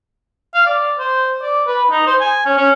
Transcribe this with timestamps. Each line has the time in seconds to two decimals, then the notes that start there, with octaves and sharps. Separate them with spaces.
0.54 F5
0.66 D5
0.99 C5
1.43 D5
1.68 B4
1.91 D#4
2.07 C5
2.21 G#5
2.46 C#4
2.58 C#4